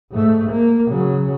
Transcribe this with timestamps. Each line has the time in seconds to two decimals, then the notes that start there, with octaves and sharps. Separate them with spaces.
0.11 G#2 A3
0.51 A#3
0.88 C#3 F#3